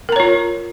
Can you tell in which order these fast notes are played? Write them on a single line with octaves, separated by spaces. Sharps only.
A#4 A#5 C#5 F4